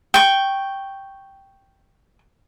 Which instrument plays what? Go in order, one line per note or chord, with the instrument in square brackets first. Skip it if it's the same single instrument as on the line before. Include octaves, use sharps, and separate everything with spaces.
[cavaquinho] G5 C#6